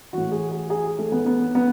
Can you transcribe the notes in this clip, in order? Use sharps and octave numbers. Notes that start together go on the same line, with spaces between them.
A2 E3 F#4
G#4
G#4
G#4
A3
B3
B3
B3